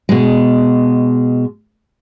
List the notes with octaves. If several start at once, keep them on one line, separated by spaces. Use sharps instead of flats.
B2 G#3